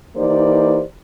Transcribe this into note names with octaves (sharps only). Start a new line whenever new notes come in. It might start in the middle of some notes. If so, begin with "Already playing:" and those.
E3 A#3 D#4 G4 C5 D5